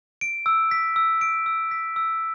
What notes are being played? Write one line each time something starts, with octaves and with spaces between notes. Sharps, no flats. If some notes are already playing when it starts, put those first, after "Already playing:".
D7
E6
B6
E6
D7
E6
B6
E6